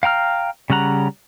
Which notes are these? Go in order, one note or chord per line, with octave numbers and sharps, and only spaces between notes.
F5 G5 A#5 F6
C#3 G3 C#4 F#5 A#5